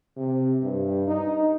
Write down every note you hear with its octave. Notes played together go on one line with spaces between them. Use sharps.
C3
G2
D#4